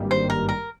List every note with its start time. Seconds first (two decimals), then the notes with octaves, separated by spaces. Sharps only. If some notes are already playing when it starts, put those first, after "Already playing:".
Already playing: G#1 G2 D#3 G3 A#3
0.11 C5
0.30 A#4
0.49 A#4